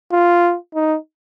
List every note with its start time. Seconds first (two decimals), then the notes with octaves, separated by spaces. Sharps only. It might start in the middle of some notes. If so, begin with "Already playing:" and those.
0.12 F4
0.75 D#4